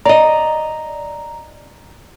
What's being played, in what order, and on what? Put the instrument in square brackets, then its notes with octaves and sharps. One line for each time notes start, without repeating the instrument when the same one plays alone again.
[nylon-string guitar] D5 D#5 [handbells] A#5